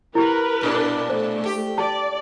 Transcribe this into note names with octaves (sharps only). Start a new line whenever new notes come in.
E4 G4 A#4 B4
G2 A#2 D4
A3 C5
G4
D5 A5